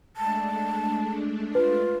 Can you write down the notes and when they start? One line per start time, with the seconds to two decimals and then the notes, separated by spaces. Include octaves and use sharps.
0.17 G#3 A3 D4 A5
1.55 F4 B4